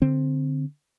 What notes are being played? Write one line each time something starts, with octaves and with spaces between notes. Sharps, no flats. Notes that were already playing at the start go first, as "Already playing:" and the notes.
D3 C4